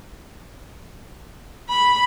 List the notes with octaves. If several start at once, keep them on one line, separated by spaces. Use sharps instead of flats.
B5